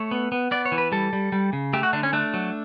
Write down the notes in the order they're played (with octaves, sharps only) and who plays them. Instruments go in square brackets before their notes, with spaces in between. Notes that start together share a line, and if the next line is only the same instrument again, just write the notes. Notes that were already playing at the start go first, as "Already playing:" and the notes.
Already playing: [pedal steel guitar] A3 C#5
B3
B3
B3 D5
C#5
E3
B4
G3 A4
G3
G3
C#3
A3 G4
F#4
D3 D4
C#4
A3 D4
F#3